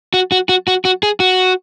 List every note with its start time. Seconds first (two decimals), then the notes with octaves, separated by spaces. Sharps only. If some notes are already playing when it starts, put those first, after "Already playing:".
0.14 F#4
0.32 F#4
0.49 F#4
0.68 F#4
0.85 F#4
1.03 G#4
1.20 F#4